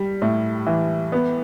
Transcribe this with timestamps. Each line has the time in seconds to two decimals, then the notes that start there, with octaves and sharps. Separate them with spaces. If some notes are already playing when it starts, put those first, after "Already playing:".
Already playing: G3
0.22 A2
0.66 E3
1.12 B3